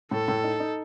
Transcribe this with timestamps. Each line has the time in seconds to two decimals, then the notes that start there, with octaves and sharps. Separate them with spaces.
0.11 A2 A4
0.28 A2
0.44 D#4
0.60 D#4